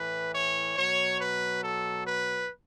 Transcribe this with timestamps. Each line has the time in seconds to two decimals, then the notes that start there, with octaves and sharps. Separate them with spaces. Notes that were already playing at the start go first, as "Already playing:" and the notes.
Already playing: A2 E3 B4
0.34 C#5
0.77 B2 F#3 C#5
1.20 B4
1.62 A4
2.05 B4